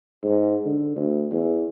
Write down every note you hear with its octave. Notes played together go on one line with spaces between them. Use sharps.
G#2
D3
D2
E2